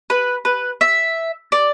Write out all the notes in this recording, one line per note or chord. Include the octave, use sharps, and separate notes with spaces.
B4
B4
E5
D5